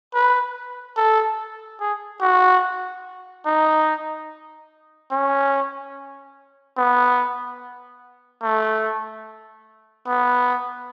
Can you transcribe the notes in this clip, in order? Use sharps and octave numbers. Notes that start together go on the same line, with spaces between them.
B4
A4
G#4
F#4
D#4
C#4
B3
A3
B3